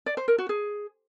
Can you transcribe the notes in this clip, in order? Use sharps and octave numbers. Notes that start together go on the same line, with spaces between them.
D5
C5
A#4
F#4
G#4